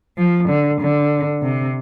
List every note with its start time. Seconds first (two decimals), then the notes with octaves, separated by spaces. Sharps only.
0.18 F3
0.49 D3
0.81 D3
1.43 C3